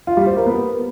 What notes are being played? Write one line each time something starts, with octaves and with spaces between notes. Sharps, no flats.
F4
G3
C5
A#4
B3